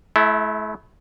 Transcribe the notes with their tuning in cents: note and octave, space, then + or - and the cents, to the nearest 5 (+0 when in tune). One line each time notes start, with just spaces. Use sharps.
A3 -40 E4 +0